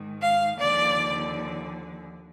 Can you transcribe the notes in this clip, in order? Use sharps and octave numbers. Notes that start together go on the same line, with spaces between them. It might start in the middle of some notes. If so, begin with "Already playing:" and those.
Already playing: G#2 D#3
F5
D#2 D3 F3 D5